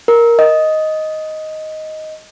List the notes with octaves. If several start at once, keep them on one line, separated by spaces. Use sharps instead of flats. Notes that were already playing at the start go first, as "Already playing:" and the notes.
A#4
D#5